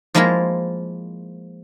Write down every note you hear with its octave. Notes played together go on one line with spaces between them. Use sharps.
F3 G#3 A#3 E4 F4 A#4